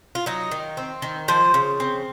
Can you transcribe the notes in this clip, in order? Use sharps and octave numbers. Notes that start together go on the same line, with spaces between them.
F4
F#3 D#4
D#3
C4
D#3
F3 C5
C#3
C4